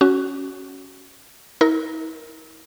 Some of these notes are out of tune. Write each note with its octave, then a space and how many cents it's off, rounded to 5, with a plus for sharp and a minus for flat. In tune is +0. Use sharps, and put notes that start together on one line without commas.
C#4 +0 F#4 +10
E4 -45 A#4 +0